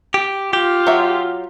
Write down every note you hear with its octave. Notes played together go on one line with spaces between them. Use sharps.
G4
F4 G4
F#3 E5